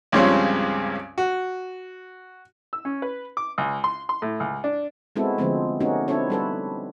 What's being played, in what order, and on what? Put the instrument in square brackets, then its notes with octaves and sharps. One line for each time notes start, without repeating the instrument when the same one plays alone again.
[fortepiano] C#2 G2 C#3 F3 C4 C#4
F#4
E6
C#4
B4
D6
C#2
C6
C6
A2
C#2
D4
[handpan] G#3 B3 C4 E4 F#4 A4
D3 F3 G#3 A3 B3 C4
A3 B3 C#4 D#4 F#4 G4
C4 D4 E4 A4 C#5
G3 A4 B4